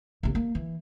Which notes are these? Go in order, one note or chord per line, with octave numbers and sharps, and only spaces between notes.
A#1 C3
A#3
E3